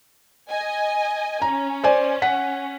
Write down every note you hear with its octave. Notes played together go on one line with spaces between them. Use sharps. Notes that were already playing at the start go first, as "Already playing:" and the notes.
D#5 G#5
C#4 A#5
C5 D5 G#5
F#5 B6